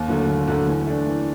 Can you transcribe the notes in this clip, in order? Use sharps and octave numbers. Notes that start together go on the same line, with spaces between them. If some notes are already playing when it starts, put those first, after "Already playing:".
Already playing: D#2
D3 F#3 A3
D#2
D3 F#3 A3
E3
A3 D4
E3